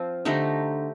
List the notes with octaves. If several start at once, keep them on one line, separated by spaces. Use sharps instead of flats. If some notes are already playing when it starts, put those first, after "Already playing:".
Already playing: F3 C4 F4
D3 A3 D#4 G4